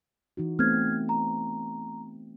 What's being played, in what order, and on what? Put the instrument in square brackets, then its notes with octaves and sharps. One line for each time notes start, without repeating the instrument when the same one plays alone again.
[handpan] E3 D#4 F#4
[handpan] A3 B3 C4 [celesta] F6 G#6
[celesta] A#5